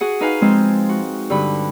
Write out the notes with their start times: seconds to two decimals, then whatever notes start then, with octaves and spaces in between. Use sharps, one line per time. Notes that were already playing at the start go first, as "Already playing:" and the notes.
0.01 F#4 G#4 F#5
0.20 D#4 B4 F5 G#5
0.41 F3 G#3 C4
0.89 F#4
1.30 G2 D3 B5